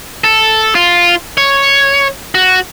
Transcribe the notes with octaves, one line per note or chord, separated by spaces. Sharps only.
A4
F4
C#5
F#4